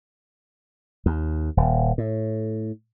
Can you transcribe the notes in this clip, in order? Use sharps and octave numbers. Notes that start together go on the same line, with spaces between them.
D#2
D#1
A2